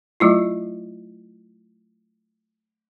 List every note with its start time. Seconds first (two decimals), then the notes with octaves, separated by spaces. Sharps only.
0.20 F#3 A3 E4 F4